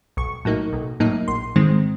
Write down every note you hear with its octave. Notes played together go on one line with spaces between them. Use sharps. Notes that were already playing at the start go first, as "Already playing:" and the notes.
B1 C#6
A2 F#3 A#3 D#4
B1
A2 F#3 A#3 D#4
A#1 C6
G#2 D#3 G#3 C4